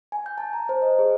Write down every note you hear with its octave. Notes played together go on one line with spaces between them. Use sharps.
G#5
G6
A5
A#5
C5
D#5
G#4